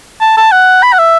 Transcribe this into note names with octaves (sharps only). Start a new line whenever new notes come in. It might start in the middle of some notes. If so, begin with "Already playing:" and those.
A5
A5
F#5
B5
F#5
E5